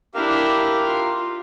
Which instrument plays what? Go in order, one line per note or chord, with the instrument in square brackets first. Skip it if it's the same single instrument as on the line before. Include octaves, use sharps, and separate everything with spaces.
[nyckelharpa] D4 E4 [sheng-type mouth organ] G4 A#4 F5
[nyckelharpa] F4